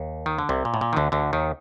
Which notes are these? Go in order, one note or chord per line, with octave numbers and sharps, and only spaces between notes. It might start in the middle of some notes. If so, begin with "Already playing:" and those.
Already playing: D#2
D#3
D3
C2 C3
A#2
A2
A#2
D#3
D2 D3
D2 D3
D#2 D#3